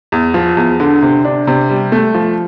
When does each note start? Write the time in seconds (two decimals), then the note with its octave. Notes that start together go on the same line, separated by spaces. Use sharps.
0.12 E2
0.34 F3
0.57 E2
0.80 D3
1.02 C3
1.25 D4
1.47 C3
1.70 G3
1.92 A3
2.14 F3